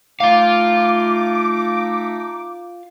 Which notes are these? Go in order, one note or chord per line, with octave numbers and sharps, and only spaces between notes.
A3 D#4 F4 F5 D6